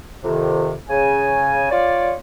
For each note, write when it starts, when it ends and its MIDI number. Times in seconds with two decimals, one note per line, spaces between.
0.23 0.74 41
0.23 0.74 48
0.23 0.74 51
0.90 1.67 49
0.90 1.67 80
1.71 2.13 65
1.71 2.13 73
1.71 2.13 74